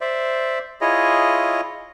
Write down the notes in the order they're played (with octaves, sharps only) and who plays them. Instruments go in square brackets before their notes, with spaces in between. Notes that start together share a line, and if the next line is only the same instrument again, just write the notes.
[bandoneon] C5 D5 E5
E4 F4 G#4 C#5 D#5